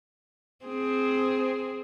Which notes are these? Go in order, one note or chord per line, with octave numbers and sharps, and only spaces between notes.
C4 G#4